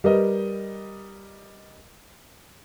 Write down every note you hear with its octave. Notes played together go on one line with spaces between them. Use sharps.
G3 G4 A#4 B4 D#5